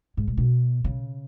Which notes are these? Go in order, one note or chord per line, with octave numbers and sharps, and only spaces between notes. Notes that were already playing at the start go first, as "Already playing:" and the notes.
G#2
A#2
B2
C#3